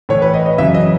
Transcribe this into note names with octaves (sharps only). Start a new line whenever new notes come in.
A2 E3 C#5
B4
D#5
D#5
F#2 C#3 E3 E5
D#5